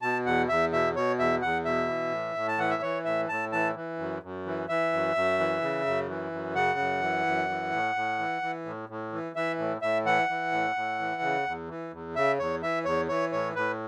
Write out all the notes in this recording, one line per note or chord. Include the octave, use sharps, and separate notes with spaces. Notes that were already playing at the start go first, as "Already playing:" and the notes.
B2 A5
E2 F#5
E2 E5
B2 E5
B2 C#5
E2 E5
E2 F#5
B2 E5
E3
A2
A2
A5
E3 F#5
E5
E3 C#5
A2 E5
A2 A5
E3 A5
E3
F#2
F#2
E3
E3 E5
F#2
F#2
E3
C#3
F#2
E3
F#2
C#3 F#5
F#2
E3
F#2
E3
A2
A2
E3
E3
A2
A2
E3
E3 E5
A2
A2 E5
E3 F#5
E3
A2
A2
E3
C#3
E2
E3
E2
C#3 E5
E2 C#5
E3 E5
E2 C#5
E3 C#5
A2 C#5
A2 B4